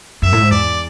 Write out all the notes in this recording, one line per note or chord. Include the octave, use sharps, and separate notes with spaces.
F#2 E5
A2
G#2
E2 D5